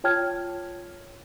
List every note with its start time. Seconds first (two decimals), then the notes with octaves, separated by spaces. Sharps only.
0.04 F4 C#5 G5 A5 F6 G#6